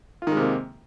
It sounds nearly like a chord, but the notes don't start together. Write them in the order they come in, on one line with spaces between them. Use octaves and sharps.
F4 D#3 G#3 C3 A#3